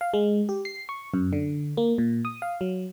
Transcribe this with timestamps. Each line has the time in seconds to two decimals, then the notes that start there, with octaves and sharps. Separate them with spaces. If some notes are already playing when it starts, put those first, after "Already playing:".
0.01 F5
0.14 G#3
0.49 G4
0.65 C7
0.89 C#6
1.14 F#2
1.33 D3
1.77 A#3
1.98 A#2
2.25 D#6
2.42 F5
2.61 F#3